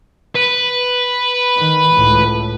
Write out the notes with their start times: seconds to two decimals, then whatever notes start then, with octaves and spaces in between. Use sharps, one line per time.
0.36 B4
1.57 D#3
1.93 C#2 A2